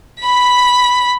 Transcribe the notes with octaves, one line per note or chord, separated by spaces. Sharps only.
B5 B6